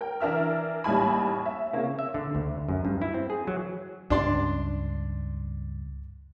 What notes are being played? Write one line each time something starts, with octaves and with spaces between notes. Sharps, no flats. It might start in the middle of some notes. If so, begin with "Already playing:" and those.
A#4 G5
E3 D4 A#4 E5 F6
A1 D#2 G3 D#4 G#5 B5
E5
C#3 A#3 C4 C#4
E5
D3
D2
F#2
G2
E4
C4
G#4
F#3
C#2 G2 C#4 D4 D5 C6